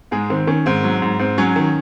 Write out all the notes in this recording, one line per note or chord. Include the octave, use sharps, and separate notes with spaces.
G#2 G#3 G#4
D#3 C4
D#3 C#4
G#2 C4
F#3
G#2
G#2 C4
F#3 C#4
D#3